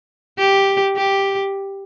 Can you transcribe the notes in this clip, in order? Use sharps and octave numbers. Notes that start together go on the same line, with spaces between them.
G4
G4